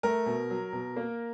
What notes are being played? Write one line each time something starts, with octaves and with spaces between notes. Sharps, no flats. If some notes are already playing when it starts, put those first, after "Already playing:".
A3 A#4
B2
F#3
B2
A#3